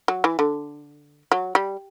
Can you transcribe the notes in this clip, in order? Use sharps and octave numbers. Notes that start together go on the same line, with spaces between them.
F#3
E3
D3
F#3
G3